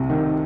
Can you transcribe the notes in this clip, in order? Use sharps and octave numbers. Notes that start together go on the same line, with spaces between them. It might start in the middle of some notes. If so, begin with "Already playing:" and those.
Already playing: C2 C3
D#3